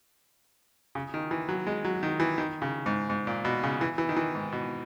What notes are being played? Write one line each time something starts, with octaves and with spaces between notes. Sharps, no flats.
C#3
D#3
E3
F#3
G#3
F#3
D#3
E3
D#3
C#3
G#2
G#2
A#2
B2
C#3
E3
E3
D#3
E3
G#2
B2